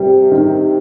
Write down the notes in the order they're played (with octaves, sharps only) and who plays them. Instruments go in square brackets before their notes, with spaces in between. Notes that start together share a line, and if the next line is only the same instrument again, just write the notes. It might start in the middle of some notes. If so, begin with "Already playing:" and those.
Already playing: [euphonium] C3 [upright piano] G3
[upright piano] D#3